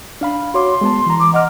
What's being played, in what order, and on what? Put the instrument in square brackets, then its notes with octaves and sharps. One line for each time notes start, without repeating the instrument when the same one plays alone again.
[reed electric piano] D4 F5 B5
[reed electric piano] F#4 C#5 D6 [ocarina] C6
[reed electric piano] G#3 B3 A5
E3 A#5
[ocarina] D6
[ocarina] D#5 [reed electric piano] F#5 D6 F6